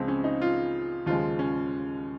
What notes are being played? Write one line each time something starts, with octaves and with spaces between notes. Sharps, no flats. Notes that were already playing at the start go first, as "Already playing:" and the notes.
Already playing: C#2 C#3 F3 G#3 C4
C#4
D#4
F4
D#2 C#3 F3 G#3 F4
C#4